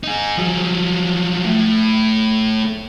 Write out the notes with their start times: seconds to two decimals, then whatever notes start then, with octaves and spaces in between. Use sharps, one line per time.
0.03 D#4 G#4
0.37 F3 F#3
1.46 A2